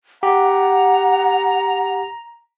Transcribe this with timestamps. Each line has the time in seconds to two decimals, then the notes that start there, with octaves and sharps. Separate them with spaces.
0.23 G4 F#5 A#5